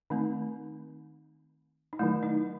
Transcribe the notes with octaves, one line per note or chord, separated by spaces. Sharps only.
D#3 A3 C4 D#4
D#4
D#3 F#3 A3 E4
D#4